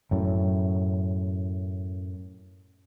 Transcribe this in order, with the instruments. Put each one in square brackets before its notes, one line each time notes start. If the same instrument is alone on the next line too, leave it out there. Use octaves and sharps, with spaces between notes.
[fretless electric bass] F#2 A2